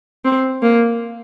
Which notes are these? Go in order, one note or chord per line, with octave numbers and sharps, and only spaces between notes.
C4
A#3